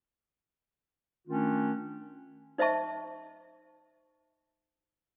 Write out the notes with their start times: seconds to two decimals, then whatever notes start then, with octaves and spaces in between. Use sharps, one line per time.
1.28 D#3 A3 C#4 D4 F4
2.58 D#4 C5 D#5 E5 A5 C#6